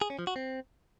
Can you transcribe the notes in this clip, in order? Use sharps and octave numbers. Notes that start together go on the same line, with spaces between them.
G#4
C#4
F3
F#4
C4